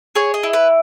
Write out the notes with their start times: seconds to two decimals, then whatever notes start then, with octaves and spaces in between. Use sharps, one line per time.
0.15 G#4 C#5
0.34 D#5
0.43 E4
0.53 B4